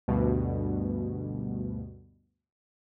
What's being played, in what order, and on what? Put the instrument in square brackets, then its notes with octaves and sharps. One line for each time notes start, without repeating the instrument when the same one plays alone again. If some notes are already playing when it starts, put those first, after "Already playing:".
[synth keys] D2 G2 B2